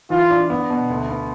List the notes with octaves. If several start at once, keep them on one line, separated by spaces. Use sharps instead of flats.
E3 F4
D4
B3
B2
D2
B3